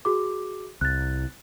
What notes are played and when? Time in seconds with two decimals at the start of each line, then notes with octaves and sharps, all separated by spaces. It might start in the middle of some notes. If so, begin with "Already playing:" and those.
0.05 F#4 G#4 D6
0.81 C2 F#6 A6